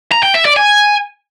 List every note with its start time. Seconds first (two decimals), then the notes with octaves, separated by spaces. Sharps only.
0.12 A#5
0.23 G5
0.34 E5
0.45 D5
0.56 G#5